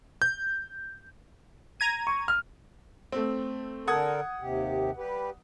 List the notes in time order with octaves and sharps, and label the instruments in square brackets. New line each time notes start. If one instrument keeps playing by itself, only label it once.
[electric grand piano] G6
[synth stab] A#5 G#6 D#7
[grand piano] C#6
F6
A3 C4
[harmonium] D3 A4 A#4 [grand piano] F#5 D#6 G#6
[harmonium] D#2 C3 G4
G3 G4 B4